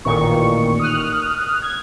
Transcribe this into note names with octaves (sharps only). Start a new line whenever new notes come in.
A1 A#2 D#3 C#6
D#6 F6 F#6
G#6